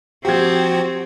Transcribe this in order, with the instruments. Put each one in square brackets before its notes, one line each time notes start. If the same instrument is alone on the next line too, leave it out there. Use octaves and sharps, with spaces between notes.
[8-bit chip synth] F3 F#4 [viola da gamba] C4 [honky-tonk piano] G4 G#6